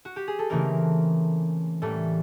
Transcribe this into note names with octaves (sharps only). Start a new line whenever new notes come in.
F#4
G4
G#4
A4
C#3 E3 A3 A#3 C4 A#4
A2 E3 G3 A3 A#3 A4